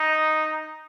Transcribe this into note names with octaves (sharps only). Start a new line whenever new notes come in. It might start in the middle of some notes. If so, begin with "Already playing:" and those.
Already playing: D#4